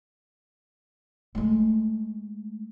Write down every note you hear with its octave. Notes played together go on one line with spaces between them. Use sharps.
G#3 A3